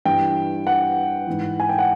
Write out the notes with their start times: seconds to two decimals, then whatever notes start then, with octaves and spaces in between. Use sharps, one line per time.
0.05 G2 E3 G5
0.67 F#5
1.27 G#2 E3
1.60 G#5
1.69 G5
1.79 F#5